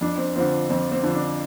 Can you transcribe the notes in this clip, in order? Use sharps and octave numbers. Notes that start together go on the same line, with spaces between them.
F2 D4
C4
D3 F3 C4
F2 C4
C4
D3 F3
D4